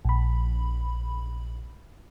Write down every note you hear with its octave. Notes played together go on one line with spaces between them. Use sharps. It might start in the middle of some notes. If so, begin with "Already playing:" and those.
A#1 B5